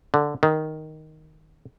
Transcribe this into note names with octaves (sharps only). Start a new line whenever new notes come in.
D3
D#3